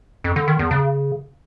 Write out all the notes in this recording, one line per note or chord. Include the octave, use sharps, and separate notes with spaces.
F2
D3
D#3
E2
C#3